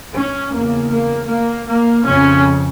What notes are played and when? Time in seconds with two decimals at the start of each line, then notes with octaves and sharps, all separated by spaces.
0.14 C#4
0.52 E2 C#3 A#3
0.90 A#3
1.28 A#3
1.66 A#3
2.04 F2 C#3 C#4